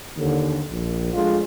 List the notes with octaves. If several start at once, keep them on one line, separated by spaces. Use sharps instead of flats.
D#2 D3
A#1
F3 G#3 A3 D4 F4